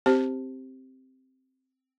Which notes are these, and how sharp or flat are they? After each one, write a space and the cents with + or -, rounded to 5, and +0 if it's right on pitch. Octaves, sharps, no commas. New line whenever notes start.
C4 +0 G4 -5 C5 +5